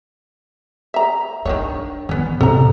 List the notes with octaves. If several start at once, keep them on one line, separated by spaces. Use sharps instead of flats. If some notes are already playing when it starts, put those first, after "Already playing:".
E5 A#5
D#3 B3 D4 C#5
D#3 E3 B3 C#4
A2 C3 A#3 A4 A#5